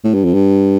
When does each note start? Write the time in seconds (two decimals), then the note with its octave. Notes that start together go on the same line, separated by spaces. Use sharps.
0.04 A2
0.14 G2
0.24 F2
0.34 G2